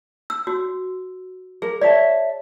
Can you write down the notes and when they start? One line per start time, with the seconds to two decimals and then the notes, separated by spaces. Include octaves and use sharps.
0.30 E6
0.47 F#4
1.62 G#4 A#4
1.81 C#5 D5 E5 A5